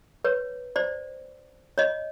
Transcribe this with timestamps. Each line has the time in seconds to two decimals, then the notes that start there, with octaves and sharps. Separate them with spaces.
0.25 B4 C#5
0.76 C5 D5
1.78 C#5 D#5